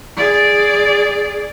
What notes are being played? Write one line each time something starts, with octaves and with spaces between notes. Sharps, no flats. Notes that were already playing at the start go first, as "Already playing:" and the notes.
G#4 D5